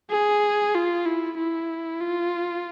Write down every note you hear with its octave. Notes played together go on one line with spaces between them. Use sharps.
G#4
F4
E4
E4
F4